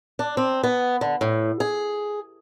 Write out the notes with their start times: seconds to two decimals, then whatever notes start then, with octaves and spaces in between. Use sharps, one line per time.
0.19 D4
0.37 C4
0.64 B3
1.01 D3
1.21 A2
1.60 G#4